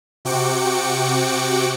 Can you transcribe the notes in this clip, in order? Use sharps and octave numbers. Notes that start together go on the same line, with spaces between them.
C3 F#4 G5 D6 C#7